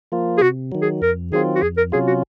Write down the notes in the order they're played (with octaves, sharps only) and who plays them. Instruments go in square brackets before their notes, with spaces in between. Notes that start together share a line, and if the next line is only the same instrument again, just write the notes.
[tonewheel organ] F3 A#3 F4
[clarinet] G#4
[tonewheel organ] C3 [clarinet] F#4
[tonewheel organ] D#3 F#3
[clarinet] G#4
[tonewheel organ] F2 [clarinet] A#4
[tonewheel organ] D#3 F#3 C4 F4 [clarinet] G#4
[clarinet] F#4
[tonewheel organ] F2 [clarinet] G#4
[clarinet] A#4
[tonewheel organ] C3 F#3 C#4 F4 [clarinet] G#4
[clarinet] F#4